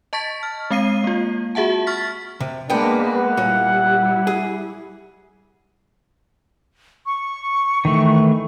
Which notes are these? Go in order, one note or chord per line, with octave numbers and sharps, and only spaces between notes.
D#5 A5 C#6 A6 B6
F6
G#3 C4 F5 C7 D#7
A#3 F4
F#4 G#4 E5 F#5 A5
C#6 F6 A6 B6
C3
G#3 A#3 B3 D4 B4 G5
F#5
A#2 G3 E4 C#5
G#4
C#6
D#3 E3 A3